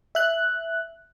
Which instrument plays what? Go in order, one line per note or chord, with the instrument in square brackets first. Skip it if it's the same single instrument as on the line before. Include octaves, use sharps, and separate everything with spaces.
[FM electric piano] E5 F#6